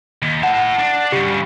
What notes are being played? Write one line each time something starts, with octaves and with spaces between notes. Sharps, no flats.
D#2
E4 F#5 A5
D4
G2 C#3 G4